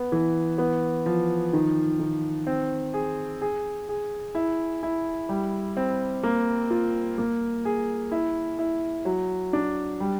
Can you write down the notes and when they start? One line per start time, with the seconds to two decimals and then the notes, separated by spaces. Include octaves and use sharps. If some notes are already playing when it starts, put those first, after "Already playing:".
Already playing: B3
0.12 E3
0.58 B3
1.06 F3
1.53 D#3
1.99 D#3
2.47 C4
2.94 G#4
3.41 G#4
3.89 G#4
4.35 E4
4.83 E4
5.29 G3
5.77 C4
6.23 A#3
6.70 F4
7.18 A#3
7.65 G#4
8.11 E4
8.59 E4
9.05 F#3
9.53 D4
10.00 G3